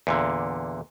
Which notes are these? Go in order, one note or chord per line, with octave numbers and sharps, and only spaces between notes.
E2 A#2 D3